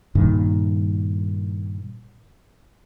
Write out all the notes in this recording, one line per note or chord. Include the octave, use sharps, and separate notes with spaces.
G2 A#2 D#3